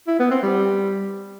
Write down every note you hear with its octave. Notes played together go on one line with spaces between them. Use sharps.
E4
B3
C4
G3